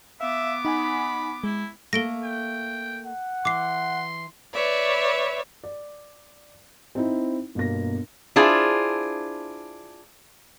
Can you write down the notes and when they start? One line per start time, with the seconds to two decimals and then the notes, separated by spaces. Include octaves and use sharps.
0.21 B3 E5 F5 D6
0.65 D#4 F#5 G#5 B5
1.44 G#3 E4
1.93 A3 A#3 A#6 D7 G7
2.24 G5
3.06 F#5
3.45 E3 C6 D6 C7
4.54 B4 C#5 D5 E5
5.64 D5
6.95 C4 D#4 E4
7.55 G1 B2 A#3 A#6
8.36 D4 E4 F4 G#4 C5